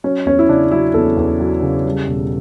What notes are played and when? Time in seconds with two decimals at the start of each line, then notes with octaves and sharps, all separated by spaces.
0.04 F#3 C#4
0.26 E2 C#4
0.39 E4
0.49 C#3 D4
0.71 F#3 E4
0.94 E2 A4
1.17 E2
1.40 F#3
1.62 C#3
1.85 G3
2.07 E1